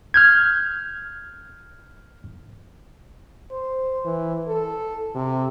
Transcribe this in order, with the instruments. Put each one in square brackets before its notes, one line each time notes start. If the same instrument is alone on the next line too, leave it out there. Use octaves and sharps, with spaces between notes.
[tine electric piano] F6 G6 G#6
[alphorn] C5
E3
A4
C3